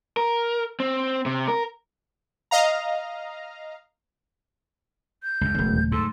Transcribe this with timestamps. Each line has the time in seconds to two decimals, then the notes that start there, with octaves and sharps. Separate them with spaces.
0.17 A#4
0.80 C4
1.26 C3
1.48 A#4
2.51 D#5 F5 A#5
5.23 G6
5.41 C#2 F#2
5.55 E1 C#2 C#3 F#3 A3
5.68 D#1
5.92 G#2 A4 C6 E6